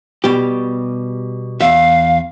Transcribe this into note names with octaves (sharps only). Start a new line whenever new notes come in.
B2 G3 G4
E2 E5 F5